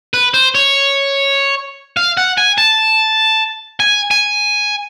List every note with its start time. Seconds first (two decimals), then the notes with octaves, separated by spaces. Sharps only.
0.14 B4
0.34 C5
0.55 C#5
1.97 F5
2.17 F#5
2.38 G#5
2.58 A5
3.80 G#5
4.11 G#5